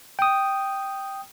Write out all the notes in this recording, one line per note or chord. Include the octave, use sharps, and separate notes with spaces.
G5 D#6